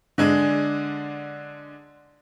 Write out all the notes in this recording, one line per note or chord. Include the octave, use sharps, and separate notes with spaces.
D3 G#3 D4